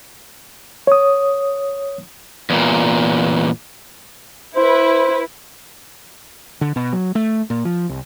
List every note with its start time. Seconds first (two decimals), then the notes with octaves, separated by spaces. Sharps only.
0.87 C#5 D#6
2.50 E2 A#2
4.56 E4 B4 C5
6.61 D3
6.76 B2
6.93 F#3
7.15 A3
7.50 A#2
7.65 F3
7.89 C2